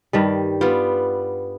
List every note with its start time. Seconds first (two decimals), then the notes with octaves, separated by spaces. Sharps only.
0.13 G2 D#3 G3
0.61 G3 B3 F4